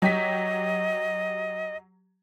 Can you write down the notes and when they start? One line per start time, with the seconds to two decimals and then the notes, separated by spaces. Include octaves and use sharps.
0.02 F#3 G4 D#5 B6